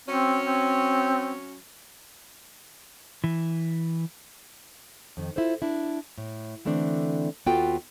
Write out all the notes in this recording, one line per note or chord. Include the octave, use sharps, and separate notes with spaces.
F#3 C4 C#4
C4
E3
F2 D#3
E4 F4 A4 C5
D4 E4
A2
D3 E3 A3 C4 D4
D#2 B3 F4 F#4 A4 G5